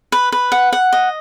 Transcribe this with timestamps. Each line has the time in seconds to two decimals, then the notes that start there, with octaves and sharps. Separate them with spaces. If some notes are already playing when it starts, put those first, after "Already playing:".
0.12 B4
0.32 B4
0.52 F#5
0.73 F#5
0.93 D#5